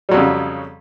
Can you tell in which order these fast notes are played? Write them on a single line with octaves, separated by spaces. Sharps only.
G3 F#3 F2 C#3